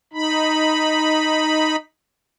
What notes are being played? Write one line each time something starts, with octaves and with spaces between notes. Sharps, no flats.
D#4 B5